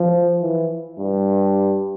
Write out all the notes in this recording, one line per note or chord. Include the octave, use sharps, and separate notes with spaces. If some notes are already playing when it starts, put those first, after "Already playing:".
Already playing: F3
E3
G2